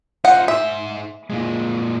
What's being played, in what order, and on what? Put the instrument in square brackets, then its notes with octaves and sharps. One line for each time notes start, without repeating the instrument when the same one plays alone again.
[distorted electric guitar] D#4 F4 [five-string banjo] C5 F#5
[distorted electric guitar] G#2 C5 [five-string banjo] E5
[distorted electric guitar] A#2 G#3